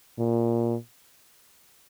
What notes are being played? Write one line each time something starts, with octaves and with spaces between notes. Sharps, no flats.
A#2